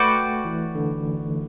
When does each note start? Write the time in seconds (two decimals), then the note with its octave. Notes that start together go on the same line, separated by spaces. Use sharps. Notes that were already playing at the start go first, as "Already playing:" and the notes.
Already playing: A3 F#4 B4 D5 G5
0.45 E3
0.75 D3